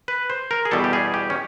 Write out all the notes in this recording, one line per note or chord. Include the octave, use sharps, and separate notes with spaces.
B4
C5
A#4
G#4
E2 B2 G3 A4
G4
G#4
G4
C#4